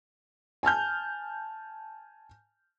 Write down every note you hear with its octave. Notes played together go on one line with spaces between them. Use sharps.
G#5 A5 F6 G6